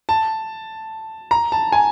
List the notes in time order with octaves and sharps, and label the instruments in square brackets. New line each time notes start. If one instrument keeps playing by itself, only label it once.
[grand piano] A5
A#5
A5
G#5